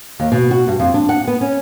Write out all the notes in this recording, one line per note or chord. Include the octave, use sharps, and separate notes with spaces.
D#2
B2
F#4
G2
F2
D4
F#5
B3
C#4